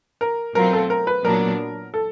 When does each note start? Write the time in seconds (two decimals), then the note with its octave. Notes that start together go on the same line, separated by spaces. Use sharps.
0.21 A#4
0.55 B2 F#3 A3 C4 F4 A#4
0.73 A4
0.90 A#4
1.07 B4
1.24 A#2 F#3 B3 D4 A#4
1.94 A4